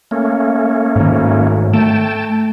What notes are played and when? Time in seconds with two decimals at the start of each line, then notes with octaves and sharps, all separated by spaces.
0.11 A3 A#3 C#4
0.96 G#2 D#3
1.74 A3 G5 A5